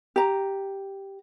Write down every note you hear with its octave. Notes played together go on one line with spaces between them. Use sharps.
G4 A#5